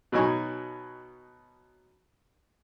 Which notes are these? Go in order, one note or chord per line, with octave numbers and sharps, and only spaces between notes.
B2 F#3 D#4 G#5 C#6